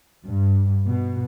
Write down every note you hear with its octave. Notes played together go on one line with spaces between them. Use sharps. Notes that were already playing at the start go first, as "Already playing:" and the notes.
G2
B2